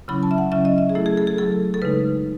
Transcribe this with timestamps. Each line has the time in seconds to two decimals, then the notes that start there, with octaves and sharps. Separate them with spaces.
0.08 C#3 F#3 C#4 E4 B5
0.23 A5
0.31 E5
0.38 F#5
0.52 C#3 F#3 C#4 E4 E5
0.65 D#5
0.78 E5
0.89 G#4
0.95 F#3 A3 E4 A4
1.06 G#4
1.17 A4
1.27 G#4
1.38 F#3 A3 E4 A4
1.74 A4
1.82 C#3 G#3 D#4 B4